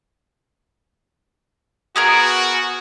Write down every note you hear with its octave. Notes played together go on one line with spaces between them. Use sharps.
B3 F#4 G#4 A#4